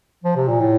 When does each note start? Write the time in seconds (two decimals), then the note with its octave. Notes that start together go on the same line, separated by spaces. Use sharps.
0.24 F3
0.36 C3
0.48 A#2
0.61 A2